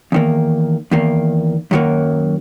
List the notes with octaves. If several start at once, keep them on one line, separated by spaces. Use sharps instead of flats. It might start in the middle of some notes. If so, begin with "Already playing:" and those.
E2 D#3 A#3
E2 D#3 A#3
F#2 D#3 F#3 A#3